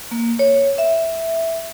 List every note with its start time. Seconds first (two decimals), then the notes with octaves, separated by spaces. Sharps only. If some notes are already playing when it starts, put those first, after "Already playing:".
0.11 A#3
0.39 C#5
0.78 E5